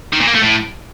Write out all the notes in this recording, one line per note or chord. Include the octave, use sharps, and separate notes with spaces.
D#3
A#2
A#3
A3
A2